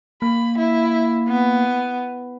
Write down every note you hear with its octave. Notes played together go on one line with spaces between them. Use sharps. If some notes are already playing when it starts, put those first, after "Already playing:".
A#3 B5
E4
B3